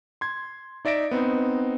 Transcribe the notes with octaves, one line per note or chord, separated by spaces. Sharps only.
C6 G#6
D#4 D5 E5 A#6 D7
B3 C4 D#4